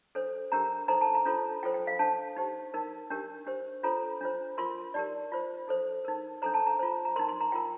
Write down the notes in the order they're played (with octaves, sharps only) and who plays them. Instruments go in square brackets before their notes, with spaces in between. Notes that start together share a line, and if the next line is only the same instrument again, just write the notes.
[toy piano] D4 A4 C5
D4 G4 A#4 A#5
D#4 A4 C5 A#5
A5
A#5
D4 F4 A4 C5
F4 A4 C5 G5
G5
F5
D4 A4 C5 A5
D#4 G4 C5
D#4 A#4
D4 G4 A#4
D4 G4 C5
D4 F4 A4 C5 A#5
D4 F4 C5
F4 A#4 C6
D#4 G4 A#4 D5
F4 C5
D#4 A4 C5
D#4 A#4
D4 A4 C5 A#5
A5
A#5
F4 C5
A#5
A#4 C6
D#4
C6
A#5
F4 A#4 G5